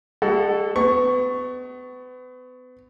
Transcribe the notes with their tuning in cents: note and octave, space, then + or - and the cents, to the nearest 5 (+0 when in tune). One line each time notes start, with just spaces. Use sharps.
G#3 -35 F#4 +25 A4 +0
B3 +35 C#6 +0